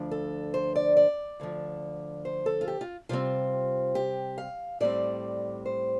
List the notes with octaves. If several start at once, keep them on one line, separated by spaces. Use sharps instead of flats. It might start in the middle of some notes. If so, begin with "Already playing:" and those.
Already playing: D2 F3 D4
A4
C5
D5
D5
D2 D3 F3
C5
A4
F4
G4
F4
C3 G3 C4 F4
G4
F5
A2 G3 C4 D5
C5